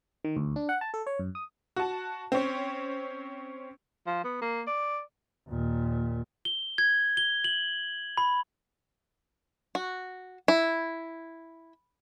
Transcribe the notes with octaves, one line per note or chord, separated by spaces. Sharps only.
D#3
D2
D4
F#5
A5
A4
C#5
F#2
D#6
F#4 A5
C4 C#4
F3
B3
A#3
D5
D#2 A#2
G7
G#6
G7
F#7
B5
F#4
E4